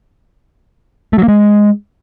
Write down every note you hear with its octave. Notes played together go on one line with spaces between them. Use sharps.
A3
F#3
A#3
G#3